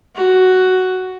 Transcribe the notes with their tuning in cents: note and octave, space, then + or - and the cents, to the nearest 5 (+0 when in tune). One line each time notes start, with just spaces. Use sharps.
F#4 +5